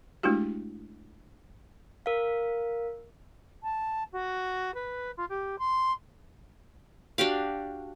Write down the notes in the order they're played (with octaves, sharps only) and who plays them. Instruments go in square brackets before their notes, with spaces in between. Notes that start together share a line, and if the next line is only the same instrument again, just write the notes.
[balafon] G#3 A3 D4 E4 F#4 G4
[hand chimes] A#4 F5
[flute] A5
F#4
B4
F4
G4
C6
[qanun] D4 F#4 G4 F5